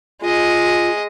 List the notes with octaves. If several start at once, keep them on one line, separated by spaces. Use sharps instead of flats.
G#3 F4 D#5